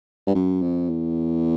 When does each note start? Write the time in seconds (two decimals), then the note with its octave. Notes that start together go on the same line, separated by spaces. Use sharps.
0.27 G2
0.35 F#2
0.62 F2
0.89 E2